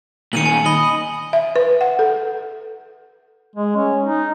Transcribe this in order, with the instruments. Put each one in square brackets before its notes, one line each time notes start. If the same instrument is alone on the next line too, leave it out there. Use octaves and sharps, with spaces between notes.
[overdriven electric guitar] A#2 D#3 [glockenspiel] C#7 D#7 F#7
[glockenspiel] G#5
[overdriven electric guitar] D#5 [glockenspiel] B5 F#7
[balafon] E5
B4
F#5
A4
[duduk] G#3
C#4
D#4